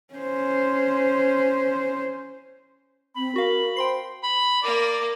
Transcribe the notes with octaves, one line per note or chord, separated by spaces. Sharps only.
C#4 C5
C4 B5
F#4 A#4 F5
C5 G5 C6 C7
B5
A#3 A#4 D5